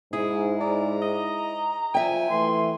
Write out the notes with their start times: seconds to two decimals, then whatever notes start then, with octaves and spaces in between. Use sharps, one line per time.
0.13 G#2 E4 G#4
0.61 D5 A#5
1.02 D#5
1.94 F3 E5 G5 G#5
2.31 E3 A3 C6